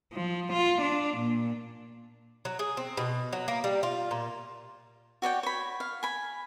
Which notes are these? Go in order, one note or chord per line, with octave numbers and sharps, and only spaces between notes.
F3
F4
D4
A#2
F#3
G#4
C4
B2
F#3
A#3
G3
F4
A#2
F#4 C#5 D5 G5
C#5 B5
F5
G#5 B5